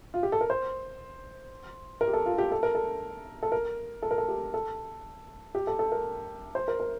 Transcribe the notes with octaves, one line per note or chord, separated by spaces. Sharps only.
F4
G4
A4
A#4
C5
A#4
G4
A4
F4
G4
A4
A#4
A4
A4
A#4
A4
A#4
A4
G4
A4
G4
A4
A4
A#4
C5
A#4
A#4